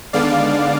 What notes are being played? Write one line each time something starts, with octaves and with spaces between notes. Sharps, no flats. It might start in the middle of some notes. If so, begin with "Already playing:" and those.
D#2 D3 G#3 B3 D4 D5 F5